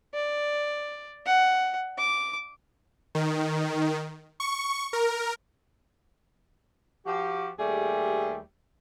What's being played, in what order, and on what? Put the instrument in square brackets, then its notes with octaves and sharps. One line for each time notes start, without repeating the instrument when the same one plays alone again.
[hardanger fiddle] D5
F#5
D6
[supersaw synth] D#3
C#6
A#4
[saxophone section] F3 F#4 G4
D#2 G3 A3 G4 G#4